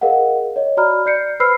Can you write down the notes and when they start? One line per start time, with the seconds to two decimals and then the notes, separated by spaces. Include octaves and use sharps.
0.01 G#4 A#4 D#5 F5 F#5
0.56 C#5 D#5
0.77 F#4 D5 A#5 B5 F6
1.06 D5 G6 C7 C#7
1.40 B4 C5 B5 E6 F6 C7